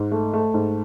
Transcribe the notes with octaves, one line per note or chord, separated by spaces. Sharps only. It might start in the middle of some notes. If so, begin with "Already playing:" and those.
Already playing: G#2
A3
A3
G#2